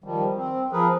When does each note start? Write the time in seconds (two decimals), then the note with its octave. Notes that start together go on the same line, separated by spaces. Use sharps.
0.04 D#3 F3 G3
0.36 C4
0.72 F3 G#4 A#4 B4